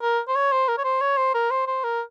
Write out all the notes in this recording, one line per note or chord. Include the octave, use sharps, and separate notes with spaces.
A#4
C5
C#5
C5
A#4
C#5
C5
C#5
C5
A#4
C5
C5
A#4